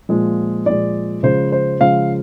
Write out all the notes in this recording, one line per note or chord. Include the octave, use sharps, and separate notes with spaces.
A#2 F3 G#3
A#2 F3 G#3 D5
C#3 F3 G#3 C5
C5
C#3 F3 G#3 F5